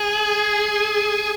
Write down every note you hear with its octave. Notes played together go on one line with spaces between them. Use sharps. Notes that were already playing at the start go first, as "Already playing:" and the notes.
Already playing: G#4